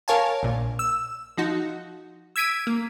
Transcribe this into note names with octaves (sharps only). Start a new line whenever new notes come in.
A#4 C#5 F5 G#5 A5
A#1 A#2
E6
F3 D#4 F#4
E6 G#6 B6 D7 D#7
A#3